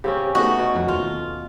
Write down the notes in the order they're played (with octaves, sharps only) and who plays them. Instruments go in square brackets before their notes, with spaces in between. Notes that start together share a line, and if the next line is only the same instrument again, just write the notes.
[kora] C#3 C4 C#4 [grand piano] G4
[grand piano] A3 B3 C#4 [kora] D#4 [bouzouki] F#4
[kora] B2
[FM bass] F2
[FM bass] D#2 [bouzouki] F4